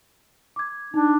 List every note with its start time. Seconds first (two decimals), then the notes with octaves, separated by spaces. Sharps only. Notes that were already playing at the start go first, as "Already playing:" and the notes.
0.56 D6 G#6
0.94 D4 D#4